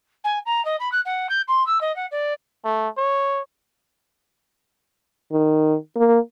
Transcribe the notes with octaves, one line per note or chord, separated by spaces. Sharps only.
G#5
A#5
D#5
B5
F#6
F#5
G6
C6
E6
D#5
F#5
D5
A3
C#5
D#3
A#3